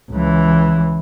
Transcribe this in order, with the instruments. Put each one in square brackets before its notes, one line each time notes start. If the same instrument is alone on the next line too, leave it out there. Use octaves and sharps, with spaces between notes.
[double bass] C#2 E3